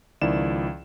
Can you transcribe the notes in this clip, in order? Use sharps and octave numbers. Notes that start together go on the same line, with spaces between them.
C#2 D#3 F3 E4 D5 E7